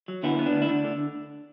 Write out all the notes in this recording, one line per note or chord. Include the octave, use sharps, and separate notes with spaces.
F#3
D3 B3 E4
B3
D4
D2
E4
D2 D4
D3